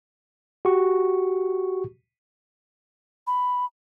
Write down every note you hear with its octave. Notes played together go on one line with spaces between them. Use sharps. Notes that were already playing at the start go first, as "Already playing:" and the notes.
F#4 G4 C#6
B5